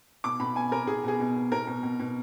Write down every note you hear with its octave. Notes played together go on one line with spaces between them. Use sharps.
B2 D6
B2 B5
B2 G#5
B2 A#4
B2 G#4
B2 G#4
B2
B2
B2 A#4
B2
B2
B2